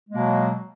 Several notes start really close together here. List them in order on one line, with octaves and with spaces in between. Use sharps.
G#3 A#3 B2 F#3